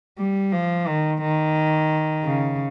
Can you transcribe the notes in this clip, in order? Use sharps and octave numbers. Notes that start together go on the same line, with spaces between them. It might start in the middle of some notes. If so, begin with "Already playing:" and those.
G3
F3
D#3
D#3
C#3